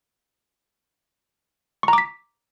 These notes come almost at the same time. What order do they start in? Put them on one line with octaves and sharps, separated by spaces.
C#6 A#5 D6 B6